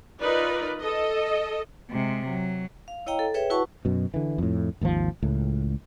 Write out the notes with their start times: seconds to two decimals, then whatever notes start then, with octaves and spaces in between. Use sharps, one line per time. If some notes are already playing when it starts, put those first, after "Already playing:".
0.20 D#4 F4 A#4 B4 D5
0.80 A4 D#5
1.91 C3 G#3
2.28 F#3
2.88 F5
3.06 E4 C#5 D#5 F5 G5 A#5
3.19 A4
3.34 G#4 B4 C#5 E5 G5
3.50 E4 F#4 B4 F#5 A5 C#6
3.85 F#2 B2
4.14 D3 E3
4.38 F2 A2
4.81 G#1 D#2 D3 F3
5.23 C#2 A2